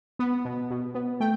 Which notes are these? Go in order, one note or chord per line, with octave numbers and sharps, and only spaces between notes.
B3
B2
B2
B3
A3 G5